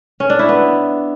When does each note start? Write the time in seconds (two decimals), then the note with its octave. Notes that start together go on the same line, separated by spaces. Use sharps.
0.20 C#4
0.30 D4
0.39 E4
0.49 B3